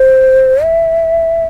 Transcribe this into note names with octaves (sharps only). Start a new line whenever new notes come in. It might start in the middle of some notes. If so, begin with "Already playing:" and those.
Already playing: C5
E5